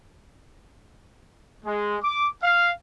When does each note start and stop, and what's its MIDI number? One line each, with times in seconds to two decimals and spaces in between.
1.65 1.97 56
2.03 2.29 86
2.43 2.71 77